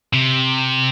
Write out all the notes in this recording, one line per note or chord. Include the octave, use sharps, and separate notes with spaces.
C3